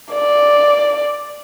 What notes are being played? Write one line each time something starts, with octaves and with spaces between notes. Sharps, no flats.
D5